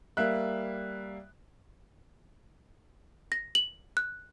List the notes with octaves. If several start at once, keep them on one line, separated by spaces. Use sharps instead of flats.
G3 A#3 E5 F#6
A#6
F#7
F#6